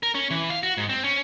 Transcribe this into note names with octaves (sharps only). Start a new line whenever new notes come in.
A#4
C#4
E3
F5
F#4
G#2
C4
C#4